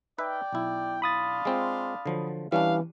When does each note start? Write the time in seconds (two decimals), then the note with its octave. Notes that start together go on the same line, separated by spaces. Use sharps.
0.18 D#4 B4 D5 E5 G5
0.53 B1 E4
1.02 D4 F5 B5 C6 D#6 A6
1.45 G#3 C4 F4
2.06 D3 F3 F#3
2.52 E3 G3 C#4 D4 E4 F5